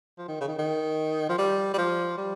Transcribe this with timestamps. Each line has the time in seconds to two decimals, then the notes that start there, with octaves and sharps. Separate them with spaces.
0.18 F3
0.28 D#3
0.41 C#3
0.48 D#3
0.58 D#3
1.29 F3
1.38 G3
1.74 G3
1.78 F3
2.17 G3